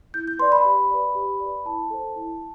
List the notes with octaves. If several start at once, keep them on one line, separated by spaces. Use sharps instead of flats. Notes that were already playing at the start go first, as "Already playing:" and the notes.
E4 G6
G6
B4 D5 C6
B5
G4
B4 D5
G4
B4 D5
E4 A5
A4 C5
E4